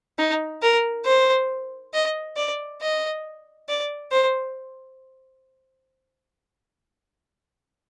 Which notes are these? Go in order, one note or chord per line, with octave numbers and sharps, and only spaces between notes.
D#4
A#4
C5
D#5
D5
D#5
D5
C5